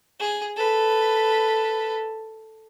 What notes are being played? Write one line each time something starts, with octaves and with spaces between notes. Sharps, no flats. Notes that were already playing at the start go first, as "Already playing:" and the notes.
G#4
A4 B4